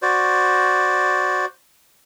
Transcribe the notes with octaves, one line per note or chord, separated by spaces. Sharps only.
F#4 C5 D5